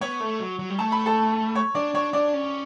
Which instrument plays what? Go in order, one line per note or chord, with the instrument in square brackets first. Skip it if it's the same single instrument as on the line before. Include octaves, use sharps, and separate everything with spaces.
[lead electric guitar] B3 [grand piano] C#5 C#6
[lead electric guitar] A3
F#3
F#3
G3
[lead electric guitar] A3 [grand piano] A5
[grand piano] B5
A4 A5
C#5 C#6
[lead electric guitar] D4 [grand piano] D5 D6
[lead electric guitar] D4 [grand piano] C#5 C#6
[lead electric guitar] D4 [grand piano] D5 D6
[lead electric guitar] C#4